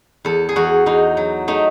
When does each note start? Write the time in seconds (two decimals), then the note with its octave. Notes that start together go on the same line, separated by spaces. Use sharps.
0.25 E2 A4
0.49 G#4
0.56 E2 F#4
0.86 E2 D#4
1.17 F#3
1.48 A3 D#4